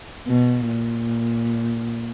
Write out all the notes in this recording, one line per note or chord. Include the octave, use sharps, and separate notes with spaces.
B2
A#2